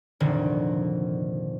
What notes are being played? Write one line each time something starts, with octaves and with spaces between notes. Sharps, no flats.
F1 A#2 D3 D#3